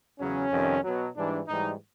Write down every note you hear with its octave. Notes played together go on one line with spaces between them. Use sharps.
E2 C#3 F#3 C#4
F2 C3 D#3 G3
B2 F#3
G#2 E3 G3 D4
G#2 E3 G3 D#4